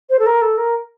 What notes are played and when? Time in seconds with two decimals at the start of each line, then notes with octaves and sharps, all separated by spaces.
0.10 C5
0.19 A4
0.26 A#4
0.42 A4
0.58 A#4